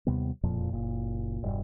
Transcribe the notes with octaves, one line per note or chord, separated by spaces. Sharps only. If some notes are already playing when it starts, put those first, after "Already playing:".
D#2 C3 G3 B3
E1 F2 A#2 F3
F#1 A#2
E1 G2